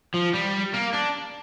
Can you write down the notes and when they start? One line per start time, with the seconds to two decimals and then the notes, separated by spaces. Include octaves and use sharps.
0.14 F3
0.34 G3
0.74 A#3
0.94 D4